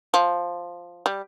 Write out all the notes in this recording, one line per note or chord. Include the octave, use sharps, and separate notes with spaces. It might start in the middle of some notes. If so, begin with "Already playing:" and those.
F3
G3